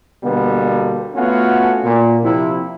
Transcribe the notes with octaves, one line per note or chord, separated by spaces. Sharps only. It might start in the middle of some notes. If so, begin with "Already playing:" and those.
B2 D3 G3 A#3 B3
A3 B3 C#4 F4 F#4
A#2
C3 F3 E4